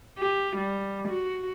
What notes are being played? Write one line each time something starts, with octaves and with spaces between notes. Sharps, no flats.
G4
G3
F#4